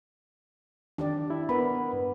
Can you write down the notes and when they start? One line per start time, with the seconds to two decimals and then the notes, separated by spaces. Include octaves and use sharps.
0.98 D#3 D4 G4 D5
1.30 E4
1.49 B3 A#4 B4 B5
1.93 G2